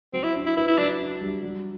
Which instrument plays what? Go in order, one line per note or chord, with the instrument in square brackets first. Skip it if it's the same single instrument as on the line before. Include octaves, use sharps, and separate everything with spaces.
[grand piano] F#3 [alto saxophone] C4
[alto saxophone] E4
[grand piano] D4
[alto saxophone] E4
[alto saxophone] E4 [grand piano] B4
[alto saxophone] E4
[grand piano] F#3 [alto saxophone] D4
[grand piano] D4
G3
F#3